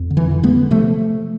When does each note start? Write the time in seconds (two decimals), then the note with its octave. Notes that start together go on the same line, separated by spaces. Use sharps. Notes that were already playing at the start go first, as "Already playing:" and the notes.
Already playing: F2
0.10 D3
0.17 E3
0.31 D3
0.43 G#3 B3
0.50 D3
0.71 C3 F3 A3